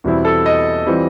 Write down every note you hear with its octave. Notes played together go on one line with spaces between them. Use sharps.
E2 B2 G3 C4 E4
A4
D#5
E3 G3 C4 F4